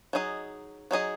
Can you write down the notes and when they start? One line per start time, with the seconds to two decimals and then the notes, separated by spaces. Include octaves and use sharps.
0.13 F#3 D#4 G#4 D#5
0.91 F#3 D#4 G#4 D#5